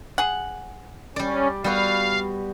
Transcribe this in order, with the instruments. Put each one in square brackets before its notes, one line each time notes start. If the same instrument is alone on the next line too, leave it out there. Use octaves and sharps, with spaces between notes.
[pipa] G#4 F#5
[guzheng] G3 D5 [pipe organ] C#4
[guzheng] G3 B3 F#4 [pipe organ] F5